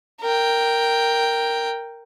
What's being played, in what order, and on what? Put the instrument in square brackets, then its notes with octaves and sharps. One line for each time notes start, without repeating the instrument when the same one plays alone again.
[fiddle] A#4 G5